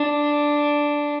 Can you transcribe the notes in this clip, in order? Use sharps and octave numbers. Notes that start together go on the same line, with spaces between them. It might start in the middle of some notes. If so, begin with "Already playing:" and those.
Already playing: D4